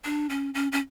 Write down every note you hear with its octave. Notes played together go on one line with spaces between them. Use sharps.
D4
C#4
C#4
C#4